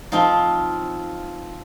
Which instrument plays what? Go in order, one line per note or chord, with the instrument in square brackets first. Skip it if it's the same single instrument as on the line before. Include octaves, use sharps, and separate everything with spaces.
[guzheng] F3 C4 D#4 F4